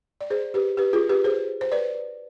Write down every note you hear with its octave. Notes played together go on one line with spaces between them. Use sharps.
D5
G#4 C5
G4 B4
G4 B4
F4 G#4
G4 B4
G#4 C5
C5
B4 D5